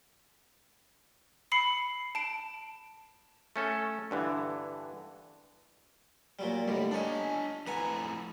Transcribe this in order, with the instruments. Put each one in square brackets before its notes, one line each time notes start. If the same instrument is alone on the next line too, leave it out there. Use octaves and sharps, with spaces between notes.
[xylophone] B5 C7 C#7
A5 D7
[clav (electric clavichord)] A3 C#4 A4
G2 D3 E3
[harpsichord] A#2 F#3 G3
[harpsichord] D#2 A2 D3 [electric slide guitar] G3
[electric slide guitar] D4 G#5 [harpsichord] D#4 C#5
[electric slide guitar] F2 A2 A#5 [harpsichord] B4 F#5 G#5